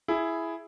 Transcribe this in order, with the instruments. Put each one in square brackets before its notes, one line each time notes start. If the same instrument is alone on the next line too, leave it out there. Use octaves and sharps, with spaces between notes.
[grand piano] E4 G#4